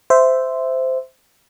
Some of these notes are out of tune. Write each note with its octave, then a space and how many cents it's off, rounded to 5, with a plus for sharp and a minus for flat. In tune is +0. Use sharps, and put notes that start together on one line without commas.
C5 -10 E5 +0